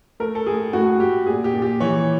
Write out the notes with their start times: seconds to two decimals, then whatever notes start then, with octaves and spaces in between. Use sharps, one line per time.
0.20 A3 A#4
0.35 A4
0.47 A2 G#4
0.73 A2 F#4
1.00 A2 G4
1.26 A#2 G#4
1.44 G4
1.54 A#2
1.62 G4
1.80 E3 C#5